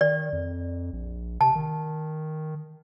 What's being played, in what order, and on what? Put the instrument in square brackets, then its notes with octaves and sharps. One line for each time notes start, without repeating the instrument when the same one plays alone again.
[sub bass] D#3 [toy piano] D5
[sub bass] F2
A#1
[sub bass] C3 [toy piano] A5
[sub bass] D#3